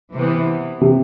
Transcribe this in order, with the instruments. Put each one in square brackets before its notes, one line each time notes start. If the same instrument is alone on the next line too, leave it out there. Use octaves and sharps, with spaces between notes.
[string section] C3 E3 B3
[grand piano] C3